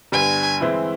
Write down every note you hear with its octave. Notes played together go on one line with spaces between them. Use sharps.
G2 D3 G3 B3 G#5
E3 G#3 C4 E4